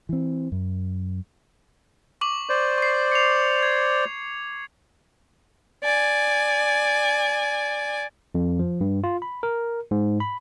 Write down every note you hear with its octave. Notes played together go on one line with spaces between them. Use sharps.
E3 C4
F#2
C#6 D6 F#7
C5 D5
C#6 C7
C#7 F7
G#6
D5 G#5
F2
F3
G2
F4
B5
A#4
G#2
B5